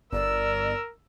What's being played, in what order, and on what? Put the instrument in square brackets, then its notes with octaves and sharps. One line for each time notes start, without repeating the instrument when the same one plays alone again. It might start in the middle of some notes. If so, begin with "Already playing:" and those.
[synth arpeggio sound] G1 [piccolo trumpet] A#4 [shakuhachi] D5 [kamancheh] E6